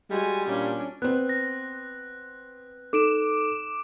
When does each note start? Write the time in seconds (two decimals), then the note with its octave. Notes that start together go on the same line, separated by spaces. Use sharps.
0.10 G3 G#3 F#4 G#5
0.47 A#2 C#4 D4
1.02 B3 C4 F#6
1.29 A#6
2.93 D#4 A4 D6 D7 E7